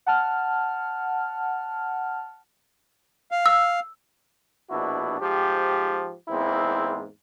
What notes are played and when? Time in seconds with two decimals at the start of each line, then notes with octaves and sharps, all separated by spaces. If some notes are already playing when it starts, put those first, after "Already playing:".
0.06 F#5 A5 F6
3.31 F5
3.46 E6
4.70 A#1 B2 D4 E4 F#4
5.20 G#2 F3 G4
6.28 E2 G#2 A#3 C4 E4